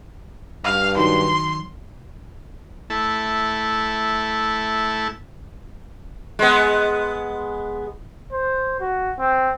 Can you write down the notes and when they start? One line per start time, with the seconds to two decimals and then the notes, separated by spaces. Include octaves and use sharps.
0.64 G2 F5
0.97 D#3 F#3 C6
2.90 A3 E4 A5
6.39 G#3 B3
8.32 C5
8.80 F#4
9.19 C4